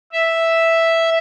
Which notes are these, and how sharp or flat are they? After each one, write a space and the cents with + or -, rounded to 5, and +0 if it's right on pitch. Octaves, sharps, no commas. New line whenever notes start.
E5 +0